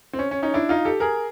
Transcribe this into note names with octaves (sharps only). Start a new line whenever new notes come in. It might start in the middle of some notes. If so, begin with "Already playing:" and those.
C4
C#4
C#4
C#4 D#4
D4 E4
D#4 F4
G4 A4
G#4 A#4